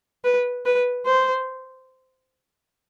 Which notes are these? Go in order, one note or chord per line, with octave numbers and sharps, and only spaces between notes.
B4
B4
C5